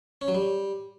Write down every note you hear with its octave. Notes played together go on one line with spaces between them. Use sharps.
C#4
F#3
G3